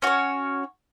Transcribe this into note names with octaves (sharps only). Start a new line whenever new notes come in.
C#4 F#4 C#5